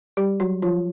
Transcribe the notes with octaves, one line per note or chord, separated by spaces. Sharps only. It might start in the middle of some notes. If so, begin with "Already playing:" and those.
G3 G4
F#3 F#4
F3 F4